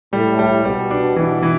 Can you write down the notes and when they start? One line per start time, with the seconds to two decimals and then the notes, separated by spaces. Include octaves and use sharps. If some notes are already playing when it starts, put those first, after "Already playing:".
0.13 A2 G3
0.39 G3
0.64 B2 G3
0.91 D4
1.16 B2 E3
1.42 E3